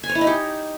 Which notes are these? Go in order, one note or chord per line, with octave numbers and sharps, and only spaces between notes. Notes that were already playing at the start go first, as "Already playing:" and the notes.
G#5
C#5
E4
D#4
G4